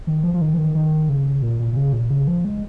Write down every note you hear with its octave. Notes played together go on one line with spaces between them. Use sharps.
D#3
F3
F3
D#3
F3
D#3
D#3
C#3
A#2
A#2
A#2
C#3
A#2
C#3
F3
G#3